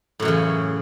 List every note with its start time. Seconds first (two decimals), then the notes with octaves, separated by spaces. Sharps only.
0.20 A2
0.22 F#2
0.25 E3
0.28 C#3